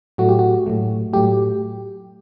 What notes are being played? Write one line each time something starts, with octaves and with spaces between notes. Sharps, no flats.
A2 F#3 A3 F#4
G4
F#4
A2 F#3 A3
A2 F#3 A3 G4